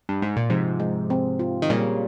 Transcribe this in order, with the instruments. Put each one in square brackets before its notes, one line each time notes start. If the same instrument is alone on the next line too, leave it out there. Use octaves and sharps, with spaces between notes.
[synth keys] G2
G#2
A#2
[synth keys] G#2 C3 [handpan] F3
[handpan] G#3
C4
F4
[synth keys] D#3
[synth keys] A#2 C#3 [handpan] G3